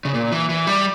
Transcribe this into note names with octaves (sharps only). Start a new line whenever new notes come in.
C#3
A#2
E3
E3
G3